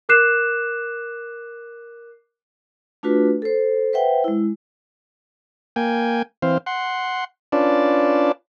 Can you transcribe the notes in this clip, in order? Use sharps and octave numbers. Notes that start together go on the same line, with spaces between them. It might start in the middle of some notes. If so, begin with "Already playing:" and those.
A#4 D6 F#6 C7 E7
A3 D4 F4 F#4 B4
A4 C5
B4 C5 E5 F#5 G5
G#3 E4
A#3 G5 G#5
E3 C4 C5 F5
F#5 C6
C#4 D4 F4 B4 D5 A5